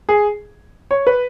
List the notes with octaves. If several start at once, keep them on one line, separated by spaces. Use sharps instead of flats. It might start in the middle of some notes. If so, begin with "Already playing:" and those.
G#4
C#5
B4